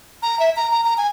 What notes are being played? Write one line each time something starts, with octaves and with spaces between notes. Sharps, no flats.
A#5
E5
A#5
A#5
A#5
G#5